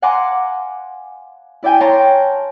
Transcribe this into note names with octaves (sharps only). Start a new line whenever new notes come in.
F5 F#5 G#5 A#5 C6 D6
E4 D5 E5 G5 G#5
C#5 F5 G5 A5 A#5 C6